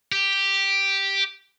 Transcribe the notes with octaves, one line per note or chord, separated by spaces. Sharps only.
G4